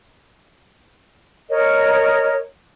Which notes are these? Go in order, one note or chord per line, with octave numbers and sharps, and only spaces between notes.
A#4 C#5 D#5